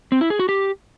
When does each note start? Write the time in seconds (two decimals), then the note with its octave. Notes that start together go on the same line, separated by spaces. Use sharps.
0.12 C4
0.21 E4
0.30 G#4
0.39 F#4
0.49 G4